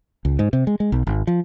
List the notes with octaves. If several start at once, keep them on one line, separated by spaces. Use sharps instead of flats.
C#2
G#2
C3
G#3
G#3
B1
G#1
F3